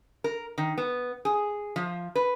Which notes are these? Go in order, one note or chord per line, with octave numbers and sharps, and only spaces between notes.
A#4
D#3
B3
G#4
F3
B4